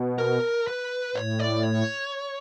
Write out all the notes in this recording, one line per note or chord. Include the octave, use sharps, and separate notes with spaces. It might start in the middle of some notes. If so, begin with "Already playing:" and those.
Already playing: B2
A#4
B4
A2 C#5
D5
C#5